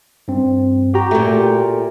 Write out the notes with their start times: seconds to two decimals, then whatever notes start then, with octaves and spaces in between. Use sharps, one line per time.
0.28 G2 C4
0.94 F#4 G4 A#5
1.11 A#2 A3